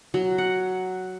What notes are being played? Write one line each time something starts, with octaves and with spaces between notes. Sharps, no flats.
F#3
F#5